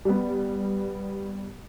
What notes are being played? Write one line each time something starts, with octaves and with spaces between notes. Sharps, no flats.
G3 B3